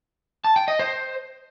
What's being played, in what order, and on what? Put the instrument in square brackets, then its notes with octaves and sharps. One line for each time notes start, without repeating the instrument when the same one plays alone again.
[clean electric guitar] A5
G5
D#5
C5